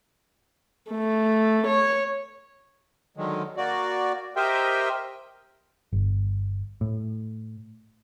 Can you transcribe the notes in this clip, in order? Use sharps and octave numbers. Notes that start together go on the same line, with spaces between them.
A3
C#5
D3 D#3 F#3 G#3
A#3 F#4 D5
G4 A#4 C5 D#5 E5 G5
G1
A2